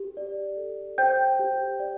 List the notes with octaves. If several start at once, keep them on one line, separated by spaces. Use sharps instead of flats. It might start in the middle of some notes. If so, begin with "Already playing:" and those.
Already playing: G4
D5
A4
C5 G5 G6
G4
D5